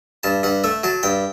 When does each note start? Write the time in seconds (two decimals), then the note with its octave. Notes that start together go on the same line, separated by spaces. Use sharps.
0.23 G2 A5
0.43 G2 F#5
0.64 A3 E5
0.83 F#3 A5
1.03 G2 G5